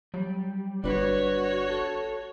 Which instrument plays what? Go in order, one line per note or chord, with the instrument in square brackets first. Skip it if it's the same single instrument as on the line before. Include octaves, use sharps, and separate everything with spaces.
[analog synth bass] F#3 [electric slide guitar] G3
[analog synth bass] G1 [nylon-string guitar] D4 B4 [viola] F#4 C#5
[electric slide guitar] A4